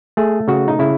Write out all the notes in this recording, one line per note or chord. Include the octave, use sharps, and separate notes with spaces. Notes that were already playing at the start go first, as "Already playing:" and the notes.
A3 G#4
C#3 F#4
D#4
C#3 E4